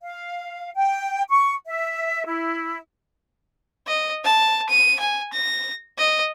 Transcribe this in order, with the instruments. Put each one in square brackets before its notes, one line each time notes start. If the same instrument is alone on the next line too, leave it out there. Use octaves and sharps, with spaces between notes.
[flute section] F5
G5
C#6
E5
E4
[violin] D#5
A5
D#7
G#5
A#6
D#5